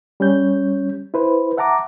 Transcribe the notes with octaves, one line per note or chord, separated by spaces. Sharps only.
G3 C#4 C#5 G6
E4 B4 C5
E5 F#5 A5 A#5 D6